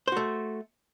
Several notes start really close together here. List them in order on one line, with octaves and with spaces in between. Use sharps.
C5 F#4 A3